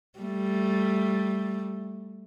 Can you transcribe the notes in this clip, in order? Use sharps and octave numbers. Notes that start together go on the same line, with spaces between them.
G3 A3